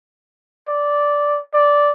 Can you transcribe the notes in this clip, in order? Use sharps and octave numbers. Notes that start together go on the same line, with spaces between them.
D5
D5